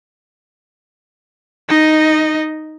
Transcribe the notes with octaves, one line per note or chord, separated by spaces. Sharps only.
D#4 D#5